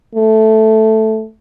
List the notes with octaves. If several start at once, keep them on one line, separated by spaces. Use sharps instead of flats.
A3